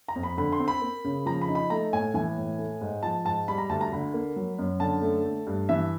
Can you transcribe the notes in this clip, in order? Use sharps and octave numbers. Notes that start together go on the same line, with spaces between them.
A#5
F2
B5
D3 B5
C6
C4
B5
A#3
C#3
F3 A#5
B5
D#4
B5
A3 A#5
A2 G#5
E3 G#5
A2
A3
G#2
F3 A5
G#2 A5
G3 B5
A#5
D2 A5
A#5
D3 B5
A#3
F#3
F#2
D3 A5
A3
A3
G2
E3 E5